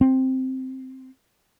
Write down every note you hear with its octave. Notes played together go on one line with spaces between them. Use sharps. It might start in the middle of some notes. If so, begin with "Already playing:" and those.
C4